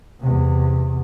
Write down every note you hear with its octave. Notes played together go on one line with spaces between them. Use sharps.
E2 C3